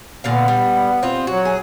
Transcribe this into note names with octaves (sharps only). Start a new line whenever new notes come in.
A#2 D3 B3 F5
G3
C4 F4
F#3 F#4
G#4